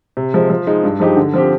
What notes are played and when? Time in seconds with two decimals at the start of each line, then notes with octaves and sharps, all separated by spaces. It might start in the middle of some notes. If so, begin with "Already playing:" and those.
0.17 C3
0.34 F3 G#3
0.50 F3
0.67 G#3 D#4
0.84 G2
1.00 F3 G#3 D#4 G4
1.17 D3
1.34 F3 C4 G4